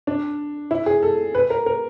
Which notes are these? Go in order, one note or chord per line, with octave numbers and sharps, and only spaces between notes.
D4
E4
G#4
A4
B4
A#4
A#4